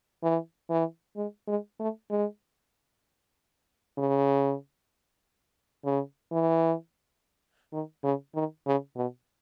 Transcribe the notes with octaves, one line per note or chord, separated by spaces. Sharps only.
E3
E3
G#3
G#3
A3
G#3
C#3
C#3
E3
D#3
C#3
D#3
C#3
B2